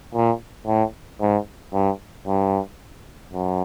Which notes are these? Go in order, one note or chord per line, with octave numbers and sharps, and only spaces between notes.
A#2
A2
G#2
G2
G2
F#2